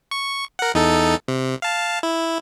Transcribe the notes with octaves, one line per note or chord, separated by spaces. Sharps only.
C#6
A#4 F#5
E2 D#4 A4
C3
F5 A5
E4